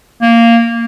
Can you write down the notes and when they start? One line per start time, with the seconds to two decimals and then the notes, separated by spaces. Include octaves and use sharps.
0.22 A#3